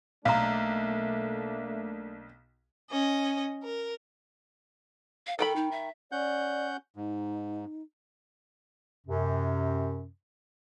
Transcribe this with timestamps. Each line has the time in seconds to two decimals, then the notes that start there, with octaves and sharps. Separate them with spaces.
0.25 B1 A3 A#3 D4 F5 A#5
2.91 C#4 D#5
3.63 A#4
5.27 F5
5.39 D#3 A4 G5 B5
5.56 D#4
5.71 E5
6.12 C#4 D5 F#5 G6
6.96 G#2 D#4
9.07 F#2 C3